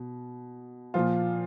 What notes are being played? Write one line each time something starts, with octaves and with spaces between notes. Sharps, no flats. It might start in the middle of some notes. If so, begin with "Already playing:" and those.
Already playing: B2
A#2 F3 F4